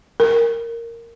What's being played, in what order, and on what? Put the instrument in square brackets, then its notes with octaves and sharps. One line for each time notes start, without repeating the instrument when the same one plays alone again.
[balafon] A#4